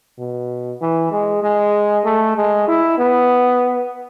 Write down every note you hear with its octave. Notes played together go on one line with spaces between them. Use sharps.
B2
E3
G#3
G#3
A3
G#3
E4
B3